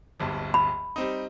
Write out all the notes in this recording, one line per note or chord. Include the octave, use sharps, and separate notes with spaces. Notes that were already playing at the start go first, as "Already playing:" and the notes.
D1 G1 G2
B5
G3 C4 D#4